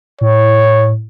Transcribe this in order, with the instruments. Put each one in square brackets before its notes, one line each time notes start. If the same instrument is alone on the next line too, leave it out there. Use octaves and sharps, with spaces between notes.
[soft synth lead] A2 [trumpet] C#5